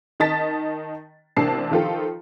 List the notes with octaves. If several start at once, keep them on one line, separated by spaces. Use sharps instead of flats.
D#3 D#5 A5 A6 B6
A1 C3 A#3 D4 A5 C7
D#3 F3 F4 G4 A4